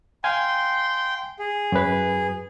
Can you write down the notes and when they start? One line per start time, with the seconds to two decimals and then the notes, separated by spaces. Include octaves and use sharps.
0.24 F5 G5 G#5 C6
1.39 G#4
1.72 F#2 B4